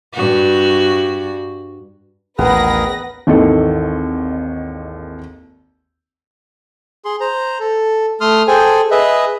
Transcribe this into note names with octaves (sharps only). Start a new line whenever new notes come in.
G2 F#4
A1 D#2 B3 G#4 A#4 B4 A#6
G#1 D#2 D#3 E3 A4
G#4 C6
C5 A#5
A4
A3 C6 D#6 F6
G#4 A4 C5 G5 G#5
G#4 B4 D#5 E5